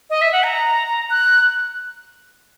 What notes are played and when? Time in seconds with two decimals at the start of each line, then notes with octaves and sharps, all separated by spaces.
0.10 D#5
0.21 E5
0.33 F#5
0.43 A#5
1.10 F#6